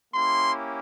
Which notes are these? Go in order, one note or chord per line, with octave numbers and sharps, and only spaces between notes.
A#3 C#4 E4 G4 C6